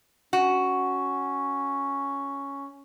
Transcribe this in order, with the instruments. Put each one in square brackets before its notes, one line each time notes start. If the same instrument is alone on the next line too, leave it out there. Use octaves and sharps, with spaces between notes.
[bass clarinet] C#4 [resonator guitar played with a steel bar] F#4